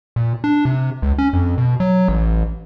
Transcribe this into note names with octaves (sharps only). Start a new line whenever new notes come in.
A#2
D4
C3
C#2
C#4
F2
B2
F#3
A1